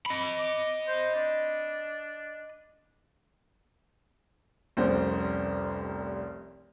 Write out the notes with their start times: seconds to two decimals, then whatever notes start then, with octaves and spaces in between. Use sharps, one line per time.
0.06 D#5 B5
0.39 D6
0.87 C5
1.15 D4
4.77 F1 C2 C#4 C5